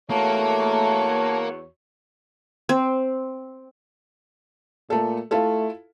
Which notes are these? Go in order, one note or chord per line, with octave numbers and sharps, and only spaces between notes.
E2 A3 A#3 F#4 C#5 A5
C4
A#2 A3 A4
A3 E4 F4 A4